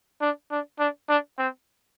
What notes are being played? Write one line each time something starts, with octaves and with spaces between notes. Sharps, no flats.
D4
D4
D4
D4
C4